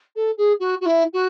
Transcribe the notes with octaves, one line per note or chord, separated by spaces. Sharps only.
A4
G#4
F#4
F#4
E4
F#4